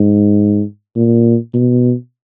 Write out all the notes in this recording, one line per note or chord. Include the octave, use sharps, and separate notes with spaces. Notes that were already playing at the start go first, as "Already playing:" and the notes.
Already playing: G#2
A#2
B2